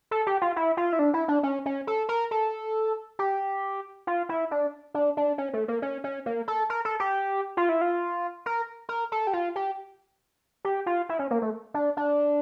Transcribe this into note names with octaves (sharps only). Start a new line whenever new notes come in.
A4
G4
F4
E4
F4
E4
D4
E4
D4
C#4
C#4
A4
A#4
A4
G4
F4
E4
D4
D4
D4
C#4
A3
A#3
C#4
C#4
A#3
A4
A#4
A4
G4
F4
E4
F4
A#4
A#4
A4
G4
F4
G4
G4
F4
E4
C#4
A#3
A3
D4
D4